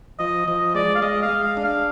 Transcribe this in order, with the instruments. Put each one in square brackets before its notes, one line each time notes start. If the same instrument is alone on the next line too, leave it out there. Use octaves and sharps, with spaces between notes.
[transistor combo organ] F3 [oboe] D#5
[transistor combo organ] F3 [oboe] D#5
[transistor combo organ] G#3 [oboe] D5
[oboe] F5
[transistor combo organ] G#3 [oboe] D#5
[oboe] F5
[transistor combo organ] G#3
[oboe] F5
[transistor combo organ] D4
[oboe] F5